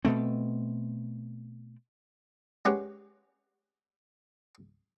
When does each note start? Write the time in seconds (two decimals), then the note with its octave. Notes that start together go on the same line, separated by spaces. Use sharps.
0.05 B2 A3 C4
2.65 G#3 C#4 G4 B4 C#5 F#5